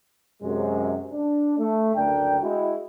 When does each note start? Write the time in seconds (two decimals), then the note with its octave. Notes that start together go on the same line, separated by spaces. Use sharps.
0.42 F#2 C3 G#3
1.12 D4
1.59 A3
1.95 F#1 D2 D4 A#4 G5
2.41 G#3 E4 F#4